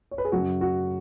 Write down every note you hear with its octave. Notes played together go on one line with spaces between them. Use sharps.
C#5
B4
G#4
F#2 C#3 F#3 F#4
F#4